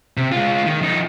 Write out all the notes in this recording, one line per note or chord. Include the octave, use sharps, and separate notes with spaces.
C3
G#3 F4
D#3
F3 D#4